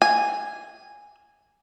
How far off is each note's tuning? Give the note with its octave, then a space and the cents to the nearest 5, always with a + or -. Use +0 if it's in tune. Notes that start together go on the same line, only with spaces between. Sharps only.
G#5 -10